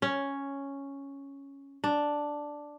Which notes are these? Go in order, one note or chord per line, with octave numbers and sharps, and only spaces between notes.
C#4
D4